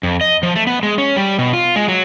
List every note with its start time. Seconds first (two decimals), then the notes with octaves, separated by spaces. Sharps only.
0.03 F2
0.21 D#5
0.43 F3
0.55 A3
0.67 B3
0.83 G#3
0.98 C#4
1.16 G3
1.39 B2
1.53 F4
1.76 G#3
1.88 F#3